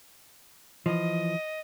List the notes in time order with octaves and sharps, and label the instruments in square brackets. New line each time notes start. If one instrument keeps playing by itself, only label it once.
[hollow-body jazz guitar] E3 F3 [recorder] D#5